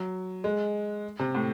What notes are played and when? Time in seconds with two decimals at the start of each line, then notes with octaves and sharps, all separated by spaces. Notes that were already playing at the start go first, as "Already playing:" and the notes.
Already playing: F#3
0.44 G#3
1.19 C3
1.35 A2